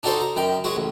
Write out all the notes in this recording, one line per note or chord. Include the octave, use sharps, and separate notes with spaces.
D4 D#4 F#4 A4 C5
A#5
F#2 D#3 G5
F#3 G#3 F#4
A1